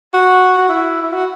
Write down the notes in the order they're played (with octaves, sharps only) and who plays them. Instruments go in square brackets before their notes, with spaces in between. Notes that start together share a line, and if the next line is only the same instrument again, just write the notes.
[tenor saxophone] F#4
F#4
E4
E4
F#4